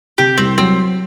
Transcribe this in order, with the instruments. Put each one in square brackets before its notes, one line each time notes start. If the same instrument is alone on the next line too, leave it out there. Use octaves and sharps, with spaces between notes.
[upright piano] C3 [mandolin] G4
[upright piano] C2 [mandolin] C4
[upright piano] F#3 [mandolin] C4